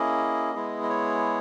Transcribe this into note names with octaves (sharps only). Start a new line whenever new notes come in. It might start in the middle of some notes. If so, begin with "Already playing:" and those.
Already playing: A#3 C#4 E4 G#4 D#5
G#3 B3 E4 G#4
D#5
C#5